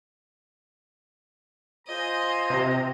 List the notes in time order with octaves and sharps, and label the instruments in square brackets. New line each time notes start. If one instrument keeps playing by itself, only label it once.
[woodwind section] F4 G#4 C5 [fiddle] D#5 G#5 [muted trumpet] A#5
[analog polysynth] C3